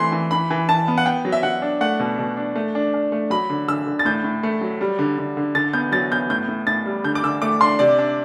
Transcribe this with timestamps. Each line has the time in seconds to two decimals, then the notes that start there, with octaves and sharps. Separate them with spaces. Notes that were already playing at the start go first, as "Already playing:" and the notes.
Already playing: E3 A3 C4 C6
0.12 E3
0.31 E3 B5
0.50 E3
0.69 E3 A5
0.88 B3
0.98 F#5
1.06 B3 G5
1.25 F#3
1.32 E5
1.43 F#3 F#5
1.62 D4
1.81 A3 F#5
2.00 B2
2.19 B2
2.37 D4
2.56 A3
2.75 D4
2.94 D4
3.12 A3
3.30 F#3 B5
3.50 D3
3.68 D3 E6
3.87 D3
3.99 A6
4.05 A2 G6
4.24 A2
4.43 A3
4.61 F#3
4.81 G3
4.99 D3
5.18 D3
5.37 D3
5.55 D3 A6
5.73 B3 G6
5.92 F#3 A6
6.11 B3 G6
6.30 A2 G6
6.48 A2
6.67 A2 A6
6.86 G3
7.04 D3 G6
7.15 D6
7.23 D3 E6
7.42 A3 D6
7.61 D4 C6
7.79 C3 D5
7.99 D4